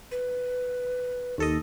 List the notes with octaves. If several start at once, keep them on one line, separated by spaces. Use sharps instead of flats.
B4
D#2 A4 D#5